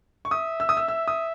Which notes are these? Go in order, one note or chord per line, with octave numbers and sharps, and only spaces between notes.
C#6
E5 D#6
E6
D#6
E6
E6
D#6